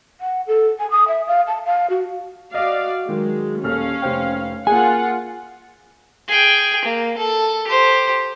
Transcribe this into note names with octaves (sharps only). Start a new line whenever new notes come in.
F#5
A4
G#5
D#6
E5
F5
A5
F5
F#4
F#4 D5 D#5 F5
D#3 F#3 G#3
D#1 C#4 A4 F5 F6
F1 C5 G5
A#3 F4 G#4 F#5 G#5
G#4 G5
A#3
A4
G4 C5